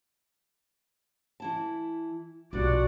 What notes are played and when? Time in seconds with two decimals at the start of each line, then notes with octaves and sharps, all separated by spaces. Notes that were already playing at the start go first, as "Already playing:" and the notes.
1.40 E3 E4 A5
2.53 B1 G2 A#2 F3 F#4 D5 F#5